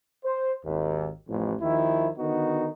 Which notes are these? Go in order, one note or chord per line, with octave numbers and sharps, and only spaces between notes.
C5
G#1 D#2
A1 F2
D#2 D#3 F3 E4
D3 D#3 B3 D#4 F#4